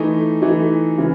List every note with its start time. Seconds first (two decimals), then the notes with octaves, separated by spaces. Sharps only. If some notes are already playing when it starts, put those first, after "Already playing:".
Already playing: E3 A3 D#4
0.42 E3 A3 D#4
0.98 C#3 E3 G#3